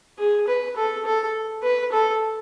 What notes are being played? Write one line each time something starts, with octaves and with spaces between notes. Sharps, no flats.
G#4
B4
A4
A4
B4
A4